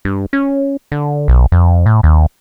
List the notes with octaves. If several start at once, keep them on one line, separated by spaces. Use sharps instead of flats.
G2
C#4
D3
B1
F2
A2
D#2